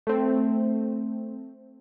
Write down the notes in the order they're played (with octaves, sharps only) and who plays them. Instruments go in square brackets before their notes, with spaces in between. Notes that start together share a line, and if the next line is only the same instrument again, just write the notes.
[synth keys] A3 C4